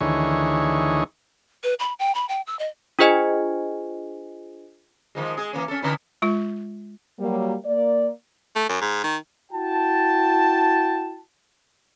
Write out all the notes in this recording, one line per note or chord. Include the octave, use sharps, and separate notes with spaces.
D2 D#3 E3 G#4 C#5
B4
B5
G5
B5
G5
E6
D#5
D4 F4 G#4 C5 D#5 G#5
D#3 F3 G#3
G#3 G#4
E3 A#3 C#4
C#4 A4
D3 C#4 E4
G#3 F4
F#3 G3 A#3
A#3 D5
A3
F#2
G#2
D#3
E4 F#4 G5 A5